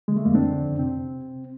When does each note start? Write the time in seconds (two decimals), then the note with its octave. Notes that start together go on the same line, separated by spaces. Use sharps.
0.08 D3 G#3
0.17 A3
0.25 F2 G#3 A#3
0.35 C4 D4
0.43 D3
0.62 F2
0.79 C3 C4